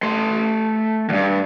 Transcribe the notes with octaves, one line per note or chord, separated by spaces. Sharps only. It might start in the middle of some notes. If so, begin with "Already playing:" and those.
A3 C6
E2 G2